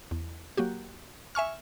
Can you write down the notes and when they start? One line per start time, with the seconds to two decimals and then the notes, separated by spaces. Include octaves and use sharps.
0.11 E2
0.57 F#3 A#3 F#4 G4
1.35 E5 G#5 C#6 F6